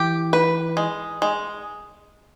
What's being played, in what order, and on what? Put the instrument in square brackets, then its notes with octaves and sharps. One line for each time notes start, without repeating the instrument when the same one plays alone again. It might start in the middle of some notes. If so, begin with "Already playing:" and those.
Already playing: [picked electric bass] E3 [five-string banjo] G4
[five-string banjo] B4
G#3
G#3